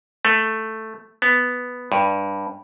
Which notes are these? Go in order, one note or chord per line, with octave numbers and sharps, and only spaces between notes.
A3
B3
G2